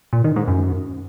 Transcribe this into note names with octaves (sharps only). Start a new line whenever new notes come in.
A#2
D#3
G#2
F#2